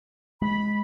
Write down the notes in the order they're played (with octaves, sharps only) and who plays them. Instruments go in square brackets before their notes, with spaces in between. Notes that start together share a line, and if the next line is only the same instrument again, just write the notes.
[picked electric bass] G#3 [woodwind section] B5